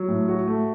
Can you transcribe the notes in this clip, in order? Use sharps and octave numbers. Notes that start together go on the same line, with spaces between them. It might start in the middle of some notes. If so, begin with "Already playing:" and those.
Already playing: F#3
A2
F#4
A3